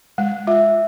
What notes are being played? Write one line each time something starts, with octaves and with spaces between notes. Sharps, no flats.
G#3 F#5
F4 E5